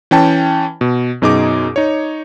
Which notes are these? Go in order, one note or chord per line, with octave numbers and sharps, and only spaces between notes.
E3 C#4 G5 A5
B2
F#2 B2 D#4 G#4 D6
D#4 C#5